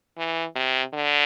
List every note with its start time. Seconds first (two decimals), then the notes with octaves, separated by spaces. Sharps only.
0.18 E3
0.56 C3
0.94 D3